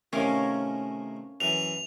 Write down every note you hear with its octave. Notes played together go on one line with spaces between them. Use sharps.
A2 C3 D#3 C#4 A#4 F5
F#2 E3 F7